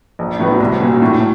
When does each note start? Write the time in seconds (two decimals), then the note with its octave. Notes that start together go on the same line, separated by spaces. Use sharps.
0.19 A#1
0.39 A2 F#3 B3
0.60 C2
0.80 A#2 F#3
1.02 A2